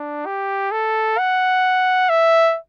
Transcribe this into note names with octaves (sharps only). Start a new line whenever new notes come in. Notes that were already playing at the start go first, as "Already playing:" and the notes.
Already playing: D4
G4
A4
F#5
E5